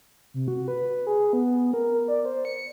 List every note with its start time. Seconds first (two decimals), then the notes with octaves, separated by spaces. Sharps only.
0.34 C3
0.48 F#4
0.68 B4
1.07 G#4
1.33 B3
1.74 A#4
2.08 D5
2.25 C5
2.45 C#7